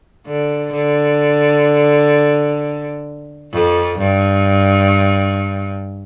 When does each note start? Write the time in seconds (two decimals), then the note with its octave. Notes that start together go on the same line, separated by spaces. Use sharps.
0.26 D3
0.73 D3
3.53 F2
3.99 G2